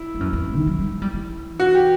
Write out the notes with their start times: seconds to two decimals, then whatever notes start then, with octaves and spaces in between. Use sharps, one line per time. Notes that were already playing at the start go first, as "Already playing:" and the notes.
Already playing: E4
0.15 G2
0.20 F#2
0.33 E2
0.45 G2
0.56 D#3
0.67 F#3
0.79 G3
0.91 A3
1.02 G3
1.13 E3
1.60 F#4
1.75 G4